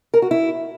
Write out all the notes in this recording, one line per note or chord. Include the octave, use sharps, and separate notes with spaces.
A#4
F#4
E4